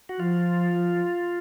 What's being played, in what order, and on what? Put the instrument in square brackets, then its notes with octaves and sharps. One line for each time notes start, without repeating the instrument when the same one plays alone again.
[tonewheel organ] F#4
[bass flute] F3 [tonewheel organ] F4